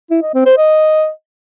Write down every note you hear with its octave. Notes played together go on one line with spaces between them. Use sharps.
E4
D#5
C4
C5
D#5